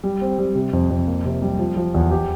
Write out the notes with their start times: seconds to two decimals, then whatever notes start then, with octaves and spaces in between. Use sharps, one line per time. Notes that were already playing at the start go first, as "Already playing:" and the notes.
0.04 G3
0.21 C4
0.39 G3
0.55 C3
0.73 F2
0.90 F2
1.08 A#3
1.25 C3
1.42 G3
1.59 F3
1.77 F3
1.95 E2
2.11 G4